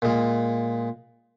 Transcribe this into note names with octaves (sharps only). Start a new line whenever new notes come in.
A#2 G#3